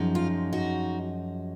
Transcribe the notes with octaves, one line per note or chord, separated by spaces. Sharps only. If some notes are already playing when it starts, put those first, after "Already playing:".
Already playing: F#2 F3 G#3 D#4
F4
D#4 F#4